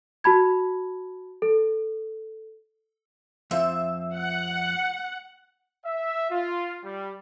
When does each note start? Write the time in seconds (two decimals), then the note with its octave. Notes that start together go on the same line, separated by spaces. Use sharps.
0.24 F#4 A5 B5 G#6
1.42 A4
3.51 F2 F3 E5
4.16 F#5
5.86 E5
6.31 F4
6.85 G3